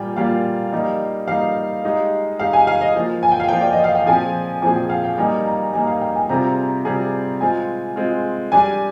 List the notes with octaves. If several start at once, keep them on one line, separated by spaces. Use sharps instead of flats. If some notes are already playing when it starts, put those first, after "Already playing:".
Already playing: A#2 G3 A#3 F4 G5 G#5
A#2 G3 A#3 F4 F5
G3 A#3 D#4
G3 A#3 D#4 F5
G#3 D#4 G4
G#3 D#4 G4 F5
G#5
F5
D#5
F3 A#3 F4
G#5
G5
F5
F3 A#3 F4 G5
D5
D#5
F5
G5
A#2 F3 C4 F4 G#4 G#5
A#2 F3 C4 F4 G#4 G#5
G5
F5
G5
G3 A#3 D#4 G#5
A#5
G3 A#3 D#4 G#5
F5
G5
G#5
C3 G3 C4 F4 G#4 A#5
C3 G3 C4 F4 G#4
G#3 C4 F4 G#5
G#3 C4 F4
G3 D4 G4 G#5